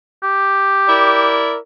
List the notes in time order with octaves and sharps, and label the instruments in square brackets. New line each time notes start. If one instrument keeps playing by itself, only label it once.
[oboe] G4
[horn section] E4 A#4 D5